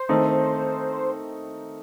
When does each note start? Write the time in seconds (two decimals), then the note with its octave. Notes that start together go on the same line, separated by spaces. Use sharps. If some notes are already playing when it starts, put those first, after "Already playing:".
Already playing: C5
0.09 D#3 A3 C4 D#4